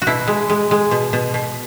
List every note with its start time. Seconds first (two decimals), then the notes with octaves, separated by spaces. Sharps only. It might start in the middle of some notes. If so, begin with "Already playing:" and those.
0.02 F#4
0.07 B2 E4
0.28 G#3
0.50 G#3
0.71 G#3
0.91 B2
1.13 B2
1.34 B2